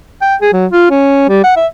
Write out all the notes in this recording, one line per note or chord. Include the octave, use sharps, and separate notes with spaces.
G5
G#4
F#3
F4
C#4
G3
F#5
E5